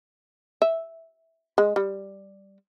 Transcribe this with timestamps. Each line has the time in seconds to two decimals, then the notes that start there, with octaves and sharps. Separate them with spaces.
0.62 E5
1.58 G#3
1.76 G3